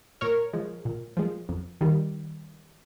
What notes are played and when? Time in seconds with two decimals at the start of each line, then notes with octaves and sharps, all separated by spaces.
0.21 A#2 A#4 C#5
0.53 F3 G#3
0.85 A#2
1.17 F3 G#3
1.49 F2
1.81 D#3 G3